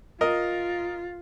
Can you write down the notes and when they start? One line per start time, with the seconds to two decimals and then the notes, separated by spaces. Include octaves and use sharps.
0.21 F4 A#4 D#5